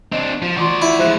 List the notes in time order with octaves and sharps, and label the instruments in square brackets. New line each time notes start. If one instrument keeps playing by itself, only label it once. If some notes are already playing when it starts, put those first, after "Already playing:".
[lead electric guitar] C4 D4 [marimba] D#5
[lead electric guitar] F3
[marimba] E3 F4 C6 [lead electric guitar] F#4 D5
[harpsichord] E4
[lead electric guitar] F3 G#3 [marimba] C5 E5 F#6